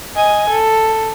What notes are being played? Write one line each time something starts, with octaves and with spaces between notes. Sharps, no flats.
D#5 G#5
A4